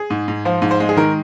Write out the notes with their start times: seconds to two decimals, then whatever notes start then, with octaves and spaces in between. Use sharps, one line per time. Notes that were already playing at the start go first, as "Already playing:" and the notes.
Already playing: G#4
0.10 G#2
0.28 G#2
0.45 F3 C5
0.62 G#2
0.71 C5
0.80 G#3
0.89 G#4
0.97 D#3 A#4